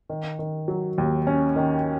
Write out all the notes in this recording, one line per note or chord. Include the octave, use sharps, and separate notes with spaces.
D#3
D#3
F#3
D#2
C#4
D#3